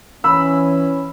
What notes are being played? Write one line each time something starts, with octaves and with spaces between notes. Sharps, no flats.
E3 C#4 B5 E6